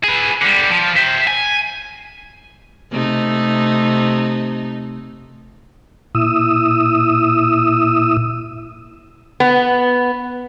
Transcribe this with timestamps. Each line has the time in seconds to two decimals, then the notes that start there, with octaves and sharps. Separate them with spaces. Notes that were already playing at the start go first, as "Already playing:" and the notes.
0.04 G#4 B4
0.41 D3 G3
0.70 F3
0.97 E5 G5
1.27 G#5
2.91 C3 A3 D#4
6.15 A#2 E4 D#6 E6
9.40 B3